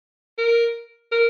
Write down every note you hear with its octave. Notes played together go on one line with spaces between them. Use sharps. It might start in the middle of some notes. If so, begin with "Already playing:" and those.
A#4
A#4